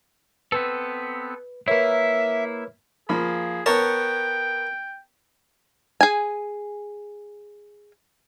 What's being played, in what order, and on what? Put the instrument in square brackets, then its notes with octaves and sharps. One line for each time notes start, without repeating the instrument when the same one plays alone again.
[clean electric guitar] B3 C4 A4 [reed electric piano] B4
[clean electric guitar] A#3 E4 [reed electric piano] A#4 B4 C#5 [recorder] E5
[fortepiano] F3 A#3 B5 [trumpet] G#4
[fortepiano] B3 C#5 [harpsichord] A#4 A5 [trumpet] G5
[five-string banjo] G#4 G#5